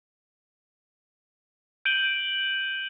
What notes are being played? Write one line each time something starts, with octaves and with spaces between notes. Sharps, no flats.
G6 D7 D#7 F#7 G7